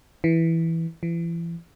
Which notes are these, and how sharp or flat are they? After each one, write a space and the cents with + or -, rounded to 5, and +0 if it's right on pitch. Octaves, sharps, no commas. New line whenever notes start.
E3 -5
E3 +35